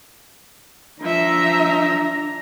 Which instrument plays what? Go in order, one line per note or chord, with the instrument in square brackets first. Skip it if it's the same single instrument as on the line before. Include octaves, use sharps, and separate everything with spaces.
[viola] F3 E5 [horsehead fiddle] D4 A#5